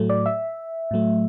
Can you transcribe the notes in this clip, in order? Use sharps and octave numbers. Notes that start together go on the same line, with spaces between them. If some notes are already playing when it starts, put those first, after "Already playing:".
Already playing: A2 F#3 A3
D5
E5
A2 F#3 A3